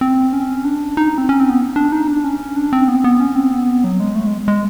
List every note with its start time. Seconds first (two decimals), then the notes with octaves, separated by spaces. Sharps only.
0.01 C4
0.33 C#4
0.64 D4
0.97 D#4
1.18 C4
1.29 C#4
1.40 C4
1.50 B3
1.76 D4
1.92 D#4
2.08 D4
2.24 C#4
2.56 D4
2.73 C4
2.88 B3
2.96 C4
3.04 B3
3.20 C#4
3.35 C4
3.51 B3
3.84 F#3
4.00 G#3
4.15 A3
4.27 G#3
4.48 G#3